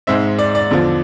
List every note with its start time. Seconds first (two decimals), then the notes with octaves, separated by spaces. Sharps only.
0.07 G#2 G#3 C4 E5
0.39 D5
0.55 D5
0.70 E2 D3 F3